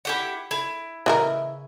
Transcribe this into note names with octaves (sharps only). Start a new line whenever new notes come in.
E4 G4 F#5
E4
C#3 E3 F4 A#4 D#5 E5